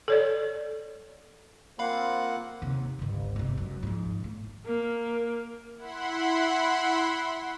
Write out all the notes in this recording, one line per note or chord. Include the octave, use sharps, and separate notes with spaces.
A4 C#5 D5
A#3 C4 F4 F5 F#5 B5
D#2 C3
G1 C#2
G#2 C3
F#2
G#2 F3
A2 A3
A#3 A#4
E4 F#5 B5 C6